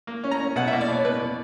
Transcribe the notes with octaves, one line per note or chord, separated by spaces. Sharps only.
A#3
C#4
A#5
C#4
B2 F#5
E5
A#3
D5
B2 C#5
B2 B4
B2 D5